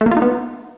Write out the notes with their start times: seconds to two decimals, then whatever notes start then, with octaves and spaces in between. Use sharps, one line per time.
0.01 A3
0.06 A#3
0.11 F4
0.17 D#4
0.22 B3